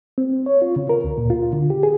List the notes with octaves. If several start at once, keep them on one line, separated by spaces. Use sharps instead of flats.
C4
C#5
F4
C#3
A#4
D2
A#2
F4
D3
G4
G#4